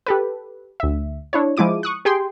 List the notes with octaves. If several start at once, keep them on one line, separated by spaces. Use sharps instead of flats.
G4 A4 B4
D2 E5
D4 E4 C#5
F3 G#3 E4 D6 D#7
C#6 D#6 F#6
G4 G#4 G5 G#5 C6